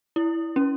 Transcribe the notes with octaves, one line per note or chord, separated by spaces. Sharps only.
E4
C#4